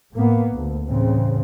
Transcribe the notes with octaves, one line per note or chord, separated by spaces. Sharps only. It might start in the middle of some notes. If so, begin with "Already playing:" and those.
A2 A#3 B3
D2
E2 A2 C#3 C4